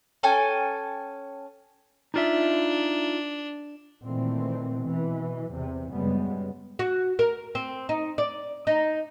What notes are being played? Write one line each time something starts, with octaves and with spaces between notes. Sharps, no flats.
C#4 A4 G5 G#5
D4 D#4 F4 E5
A#2 D#3 E3 A3 C4
B2 E3
E2 C3
F#2 C#3 G3 G#3 B3
F#4
A#4
C4
D#4
D5
D#4